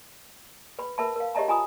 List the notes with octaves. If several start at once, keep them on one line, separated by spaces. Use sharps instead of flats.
B4 B5
A#4 B4 E5 A5 B5
A#4 F5
G4 C#5 D#5 E5 A5 A#5
F4 G#5 A#5 B5 D#6